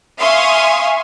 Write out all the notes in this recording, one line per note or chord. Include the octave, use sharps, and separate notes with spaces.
E5 F5 G#5 C6 C#6 D#6